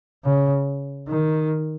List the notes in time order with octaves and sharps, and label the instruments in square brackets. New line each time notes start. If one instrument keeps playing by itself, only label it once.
[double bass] C#3
D#3